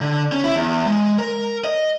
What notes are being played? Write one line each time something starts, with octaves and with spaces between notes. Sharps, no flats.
D3
C#4
E4
E2
G#3
A#4
D#5